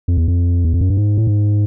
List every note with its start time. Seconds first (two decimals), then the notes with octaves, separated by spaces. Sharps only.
0.08 F2
0.17 E2
0.28 F2
0.65 E2
0.74 F2
0.81 F#2
0.90 G2
0.97 G#2
1.17 A2
1.27 G#2